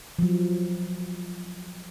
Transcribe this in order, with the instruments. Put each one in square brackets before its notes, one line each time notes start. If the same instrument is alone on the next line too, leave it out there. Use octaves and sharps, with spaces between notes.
[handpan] F3 F#3